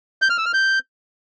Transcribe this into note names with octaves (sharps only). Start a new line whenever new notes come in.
G6
F6
E6
F6
G6